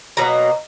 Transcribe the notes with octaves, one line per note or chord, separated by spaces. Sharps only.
B2 F#3 A#3 A#5